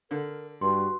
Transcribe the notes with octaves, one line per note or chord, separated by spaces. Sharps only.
D3 A#4
G2 F#4 C6